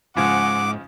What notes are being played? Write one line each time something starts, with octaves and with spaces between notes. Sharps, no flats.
G#2 C#3 F3 G#3 F#5 D6